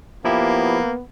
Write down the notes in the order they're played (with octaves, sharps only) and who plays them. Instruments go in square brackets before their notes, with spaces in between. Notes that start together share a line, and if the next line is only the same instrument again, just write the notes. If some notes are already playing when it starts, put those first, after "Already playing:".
[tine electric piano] F3 E4 G4 [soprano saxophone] A#3 [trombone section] B3